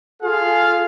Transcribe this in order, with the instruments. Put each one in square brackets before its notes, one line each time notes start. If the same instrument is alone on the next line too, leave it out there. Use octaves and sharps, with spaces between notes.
[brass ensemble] F4 G#4 A4 F5